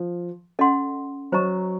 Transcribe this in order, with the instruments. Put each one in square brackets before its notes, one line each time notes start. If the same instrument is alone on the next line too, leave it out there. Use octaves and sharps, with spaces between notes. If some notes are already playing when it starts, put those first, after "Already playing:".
Already playing: [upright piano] F3
[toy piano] C#4 A4 D#5 F#5 C6
[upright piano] F#3 [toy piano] C5 D#5 A#5 C#6